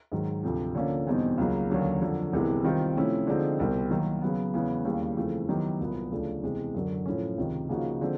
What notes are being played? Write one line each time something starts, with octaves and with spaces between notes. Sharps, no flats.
G#2 D#3 F#3
D2 C3 F3
D3 F3 A#3 C#4 F4
E2 B2 G3 C4 D#4
C#2 C#3 F#3 A#3
D#2 D3 F#3 A#3 C#4
F2 D3 F#3
C2 C3 E3 G#3 B3
D#3 G3 C4 F4
C3 F3 A3 C#4 E4
D3 F3 G#3 C4 D#4
C2 B2 G3 C4
D#3 F#3 A#3
C#3 F#3 B3
E2 C#3 E3 G#3 B3
D#2 C#3 E3 G3
F2 C#3 E3 A3 C4
D#3 F#3 B3 E4 G4
C2 A#2 F#3 B3
D2 C#3 F3 A3 D4
E2 C3 E3 G#3
F#2 D3 F#3
A2 F3 A3 C#4
C#2 C3 D#3
C#3 F3 A#3 D#4 F#4
D3 F3 G#3 C4